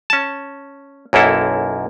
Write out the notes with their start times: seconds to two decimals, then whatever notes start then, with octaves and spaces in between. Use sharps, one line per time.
0.10 C#4 A5
1.13 B1 F#2 A#3 E4 A4